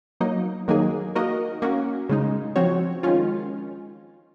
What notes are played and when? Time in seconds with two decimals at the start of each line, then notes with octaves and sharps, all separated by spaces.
0.21 F#3 A#3 D#4
0.68 D#3 F#3 A#3 D#4 G#4
1.15 A#3 D#4 F#4 A#4 D#5
1.62 A#3 C#4 F#4
2.09 C#3 G#3 D#4
2.56 F3 C4 F#4 C#5
3.03 D#3 G#3 C#4 F4